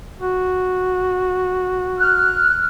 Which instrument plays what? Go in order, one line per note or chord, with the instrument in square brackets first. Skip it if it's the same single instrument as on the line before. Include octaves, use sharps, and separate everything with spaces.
[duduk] F#4
[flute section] F6 F#6